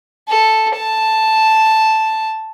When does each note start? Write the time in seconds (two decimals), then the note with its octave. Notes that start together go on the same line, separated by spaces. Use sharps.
0.29 A4
0.77 A5